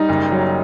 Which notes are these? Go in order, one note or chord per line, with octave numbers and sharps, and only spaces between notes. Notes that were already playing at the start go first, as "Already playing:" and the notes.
Already playing: G3 D#4
F#1
F#3